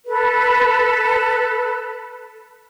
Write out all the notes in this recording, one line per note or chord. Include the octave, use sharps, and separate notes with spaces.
A4 B4